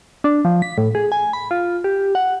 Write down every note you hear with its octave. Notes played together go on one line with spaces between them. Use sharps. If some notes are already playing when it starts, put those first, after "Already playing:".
D4
F3
B6
A2
G#4
G#5
B5
F4
G4
F#5